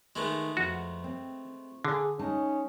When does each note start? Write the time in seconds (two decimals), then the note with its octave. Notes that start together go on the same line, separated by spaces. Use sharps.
0.16 D#3 G#3 A3 B3 G#4
0.57 F2 F3 F#4 F#5
1.04 C4
1.85 D3 G#4
2.19 G#3 C#4 D#4 A5